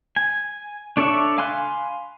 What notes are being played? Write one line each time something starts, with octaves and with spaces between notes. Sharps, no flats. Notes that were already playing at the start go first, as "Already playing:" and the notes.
G#5
D4 A4 C#5 D5 E5
F5 G#5 B5 C6 F#6